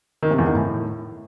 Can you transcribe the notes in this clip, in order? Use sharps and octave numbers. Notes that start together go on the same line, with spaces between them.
D#3
C3
E2
D#3
A2